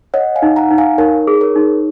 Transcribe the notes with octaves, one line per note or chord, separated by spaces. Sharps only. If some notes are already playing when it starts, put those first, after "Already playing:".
C#5 D#5 F#5
F5 G#5
D#4
F#5 A#5
D#4
F5 G#5
D#4 A#4 C#5
G#4
A#4 C#5
D#4